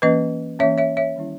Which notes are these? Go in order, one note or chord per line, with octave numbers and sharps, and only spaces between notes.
E3 A#3 C#4 B4 D#5
E3 A#3 C#4 C#5 E5
C#5 E5
C#5 E5
D#3 G3 C#4 E4